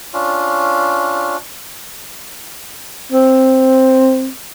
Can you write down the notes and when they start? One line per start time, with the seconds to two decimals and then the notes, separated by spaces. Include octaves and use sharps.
0.13 C#4 D4 F4
3.12 C4